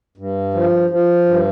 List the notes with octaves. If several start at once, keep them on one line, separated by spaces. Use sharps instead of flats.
G2
F3
F3
G2